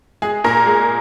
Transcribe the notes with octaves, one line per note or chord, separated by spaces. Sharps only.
G#3 G#4
A#2 A#4
G#3 G#4